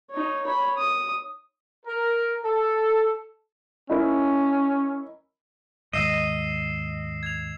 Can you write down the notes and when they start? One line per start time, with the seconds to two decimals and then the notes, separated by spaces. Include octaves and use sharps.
0.11 D#4 C#5
0.46 C#5 B5
0.77 D#6
1.86 A#4
2.44 A4
3.90 C#4 D#4 E4 A#4
5.93 D#2 G#2 D#5 E6 C7 E7
7.23 G#6 F7